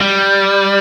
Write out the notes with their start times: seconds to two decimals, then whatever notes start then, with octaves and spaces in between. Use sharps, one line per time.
0.01 G3